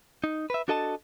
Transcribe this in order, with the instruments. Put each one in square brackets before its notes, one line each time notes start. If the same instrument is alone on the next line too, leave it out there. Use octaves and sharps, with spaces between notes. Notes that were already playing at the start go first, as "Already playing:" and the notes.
[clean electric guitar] D#4
B4 E5
D4 F#4 A4 D#5 G5 A5